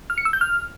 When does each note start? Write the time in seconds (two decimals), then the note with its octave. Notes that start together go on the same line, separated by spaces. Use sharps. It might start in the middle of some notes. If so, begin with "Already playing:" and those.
0.10 F6
0.18 C#7
0.25 E6
0.33 G6
0.41 F6